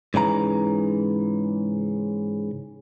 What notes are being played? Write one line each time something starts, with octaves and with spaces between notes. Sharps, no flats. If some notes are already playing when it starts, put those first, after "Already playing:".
G#2 C#3 E3 A#5